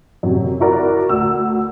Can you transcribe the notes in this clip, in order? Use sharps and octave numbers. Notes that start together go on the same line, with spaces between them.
F#2 C3
E4 F#4 A#4 D5
D2 E6